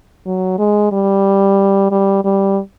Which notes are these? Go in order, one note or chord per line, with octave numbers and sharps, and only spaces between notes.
F#3
G#3
G3
G3
G3